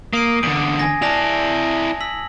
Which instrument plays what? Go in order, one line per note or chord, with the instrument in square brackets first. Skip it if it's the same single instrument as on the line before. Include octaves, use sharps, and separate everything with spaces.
[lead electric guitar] A#3 [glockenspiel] D#6 C7 D#7
[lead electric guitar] E2 D3 [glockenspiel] D7
[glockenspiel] G#5 G#6 A#6
[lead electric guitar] E4 D5 [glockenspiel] A5 A#6 F7
[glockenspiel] E6 B6 F#7